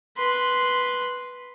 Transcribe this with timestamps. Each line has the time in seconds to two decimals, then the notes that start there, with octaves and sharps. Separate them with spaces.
0.17 B4 C6